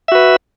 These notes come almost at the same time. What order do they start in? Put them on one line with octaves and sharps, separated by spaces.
E5 F#4 B4